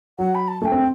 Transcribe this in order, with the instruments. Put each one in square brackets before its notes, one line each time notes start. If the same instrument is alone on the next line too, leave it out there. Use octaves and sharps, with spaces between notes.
[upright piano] F#3 [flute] F#5
[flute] B5
A5
[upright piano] A3 [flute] G5 A5
[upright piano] C4